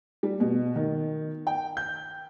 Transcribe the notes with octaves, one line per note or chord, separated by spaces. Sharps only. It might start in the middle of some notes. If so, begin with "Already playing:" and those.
G3
B2
D#3
G5
G6